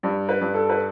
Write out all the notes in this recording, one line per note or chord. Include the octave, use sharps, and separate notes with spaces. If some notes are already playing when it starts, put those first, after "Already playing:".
G2
B4
G2
A4
B4